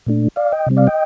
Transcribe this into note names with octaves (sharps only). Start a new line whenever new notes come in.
A#2 A3 D4
D5 F5
D#5 G5
C3 G3 C4
D5 F5
D#5 G5